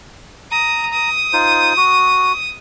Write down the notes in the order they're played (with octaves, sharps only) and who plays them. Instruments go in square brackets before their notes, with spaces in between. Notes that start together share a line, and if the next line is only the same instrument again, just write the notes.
[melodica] A#5 [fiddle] D#6
[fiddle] D#6
[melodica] D#4 F4 C5
F#4